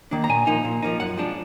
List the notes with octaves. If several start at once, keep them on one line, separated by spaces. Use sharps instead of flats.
D#3 A#3 D4
A#5
A#2 G#5
F3 A#3 D#4
A#2
F3 A#3 D#4
F#2 F#5
F3 G#3 D4